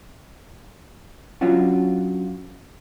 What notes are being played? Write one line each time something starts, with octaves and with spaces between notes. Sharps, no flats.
F#3 C#4 D4 F4 F#4